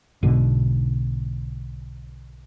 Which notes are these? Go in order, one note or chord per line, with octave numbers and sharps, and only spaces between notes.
B1 G#2 B2 D3